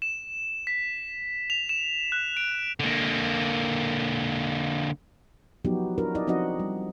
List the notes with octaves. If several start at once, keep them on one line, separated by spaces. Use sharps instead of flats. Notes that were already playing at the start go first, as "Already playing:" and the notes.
E7
B6
F7
E7
F#6
D7
D3 A#3
F3 F#3 B3 D#4 F#4 G4
D4 E4 F#4 A#4 B4
D#4 E4 D5 D#5
F3 C4 D#4 F#4 D#5 F#5
G3